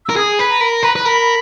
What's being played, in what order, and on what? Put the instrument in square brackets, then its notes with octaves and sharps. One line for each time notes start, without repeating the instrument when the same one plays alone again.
[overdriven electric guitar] A#4 [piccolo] E6
[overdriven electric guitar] G#4 [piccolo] D#6
[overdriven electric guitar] B4 [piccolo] B5
[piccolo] A#5
[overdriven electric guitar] A#4 [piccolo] B5
[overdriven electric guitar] B4 [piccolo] A#5
[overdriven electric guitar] B4
[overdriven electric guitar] A#4 [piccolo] B5